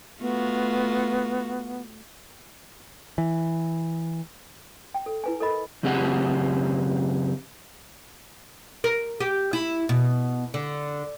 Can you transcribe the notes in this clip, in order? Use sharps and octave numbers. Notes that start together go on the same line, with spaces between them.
A3 B3 F4 F#4
E3
G5
A4
E4 B4 G#5
A4 A#4 D#5 B5
F#2 C#3 C4 G4 D#5 F#5
A#4
G4
E4
B2
D3